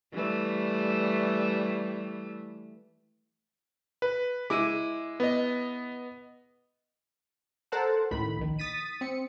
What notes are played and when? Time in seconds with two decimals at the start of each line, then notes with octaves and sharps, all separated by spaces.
0.12 E3 G3 A3
4.02 B4
4.50 G#3 E4 D6 D#7
5.20 B3 D#5
7.72 A4 A#4 C5 F#5 A5
8.11 C#2 A2 D#3 B5
8.37 A#1 D#3
8.59 D#6 A6 B6 D#7
9.01 C4 C#7